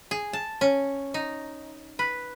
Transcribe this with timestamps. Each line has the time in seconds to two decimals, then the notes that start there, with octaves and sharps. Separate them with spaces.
0.11 G#4
0.33 A5
0.61 C#4
1.14 D#4
1.99 B4